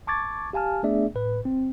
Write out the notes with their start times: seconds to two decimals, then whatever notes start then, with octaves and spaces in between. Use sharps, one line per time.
0.07 A5 C#6 D6 G#6 A6
0.53 G4 F5 G#5 A5 F6
0.83 A3 B3 D4 G#4 D5 E5
1.15 A2 B4
1.45 C4